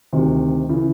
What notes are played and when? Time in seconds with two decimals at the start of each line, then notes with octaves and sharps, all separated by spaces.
0.13 D2 C3 D#3
0.69 C#3 E3